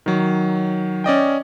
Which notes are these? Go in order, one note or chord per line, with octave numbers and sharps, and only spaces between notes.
D#3 F#3
C#4 D5 D#5 G5